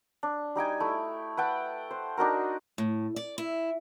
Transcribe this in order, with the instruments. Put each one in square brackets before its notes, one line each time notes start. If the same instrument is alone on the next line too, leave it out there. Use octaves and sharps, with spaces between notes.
[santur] D4
G3 D#4 G5 G#5
A3 E4
B4 F#5 G5 A5
C5
D4 D#4 F#4 A#4
[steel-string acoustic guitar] A2
D5
E4